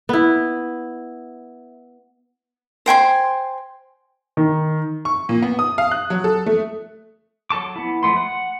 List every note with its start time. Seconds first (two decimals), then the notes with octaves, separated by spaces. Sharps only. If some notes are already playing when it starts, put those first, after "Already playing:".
0.09 B3 E4
2.86 C5 G5 G#5 C6
4.37 D#3
5.05 C#6
5.29 A#2
5.42 B3
5.59 D#6
5.78 F5
5.91 F#6
6.10 F#3
6.24 A4
6.46 A3
7.50 F#3 A4 A5 D6
7.76 B3 E4
8.03 F3 A3 B3 C6
8.16 F#5